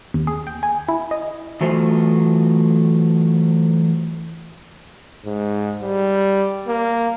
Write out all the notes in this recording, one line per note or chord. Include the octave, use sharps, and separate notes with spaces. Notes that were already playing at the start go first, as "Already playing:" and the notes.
D#2
G#4
G5
G#5
E4
D#5
E3 F#3 A3 B3 F4 C5
G#2
G3
A#3